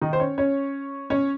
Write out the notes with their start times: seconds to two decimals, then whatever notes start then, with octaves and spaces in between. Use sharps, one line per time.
0.02 D#3 D#4
0.13 C5
0.20 C#4 C#5
0.38 C#4 C#5
1.10 C#4 C#5